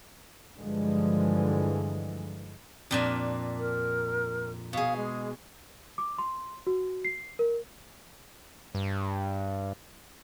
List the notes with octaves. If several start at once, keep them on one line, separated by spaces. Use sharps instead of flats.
G2 D3 E3 F3 G#3
F2 A#2 D4
A#4
B2 G#4 F5
G#3
D6
C6
F#4
C7
A#4
G2